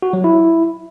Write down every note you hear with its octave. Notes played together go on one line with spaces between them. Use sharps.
F#4
F#3
E4